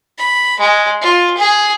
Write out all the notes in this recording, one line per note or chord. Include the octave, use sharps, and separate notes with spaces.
B5
G#3
F4
G#4